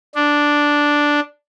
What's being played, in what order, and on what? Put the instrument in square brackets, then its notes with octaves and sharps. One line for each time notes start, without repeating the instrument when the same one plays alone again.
[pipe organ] D4